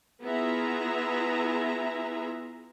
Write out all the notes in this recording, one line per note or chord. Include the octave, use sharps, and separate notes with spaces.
B3 E4 F4 G#4 E5 A#5